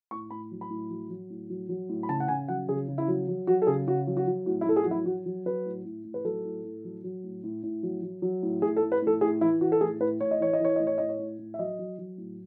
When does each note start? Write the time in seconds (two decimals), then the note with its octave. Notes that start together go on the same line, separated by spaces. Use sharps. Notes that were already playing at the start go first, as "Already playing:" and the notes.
0.11 A2 C#6
0.30 A2 B5
0.51 F#3
0.61 B5
0.70 A2
0.90 F#3
1.10 F#3
1.30 A2
1.50 F#3
1.69 F#3
1.89 A2
2.03 B5
2.09 C#3 A5
2.20 F#5
2.28 C#3 G#5
2.48 F#3 F#5
2.68 C#3 G#4
2.88 C#3
2.98 E4
3.08 F#3
3.28 F#3
3.47 F#3 F#4
3.62 A4
3.67 C#3 G#4
3.87 C#3 F#4
4.07 F#3
4.17 F#4
4.27 F#3
4.46 A2 F#4
4.61 E4
4.66 A2 A4
4.76 G#4
4.83 F#4
4.86 F#3 E4
5.06 F#3 F#4
5.26 F#3
5.46 F#3 B4
5.66 A2
5.85 A2
6.04 A2
6.14 B4
6.24 F#3 A4
6.45 A2
6.64 A2
6.84 F#3
7.04 F#3
7.24 A2
7.44 A2
7.63 A2
7.83 F#3
8.03 F#3
8.22 F#3
8.43 A2
8.62 A2 G#4
8.77 A4
8.83 A2
8.92 B4
9.02 A2 A4
9.21 A2 G#4
9.41 E3 E4
9.61 E3 F#4
9.72 A4
9.81 A2 G#4
10.00 A2 B4
10.20 A2 C#5
10.31 D#5
10.40 E3 C#5
10.53 D#5
10.60 E3 C#5
10.76 A2 D#5
10.87 C#5
10.98 A2 D#5
11.09 C#5
11.19 A2
11.39 A2
11.54 E5
11.59 F#3 D#5
11.79 F#3
11.98 F#3
12.18 A2